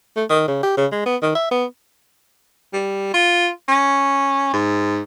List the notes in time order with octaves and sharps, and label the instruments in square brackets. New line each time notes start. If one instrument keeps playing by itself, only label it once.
[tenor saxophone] A3
D#3
C#3
G4
C#3
G#3
B3
D#3
E5
B3
[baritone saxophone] G3
F4
C#4
G#2